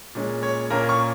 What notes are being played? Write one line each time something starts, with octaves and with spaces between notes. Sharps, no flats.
A#2 G#3 C#4
C#5
A#2 A#3 C#4 A#4
C#6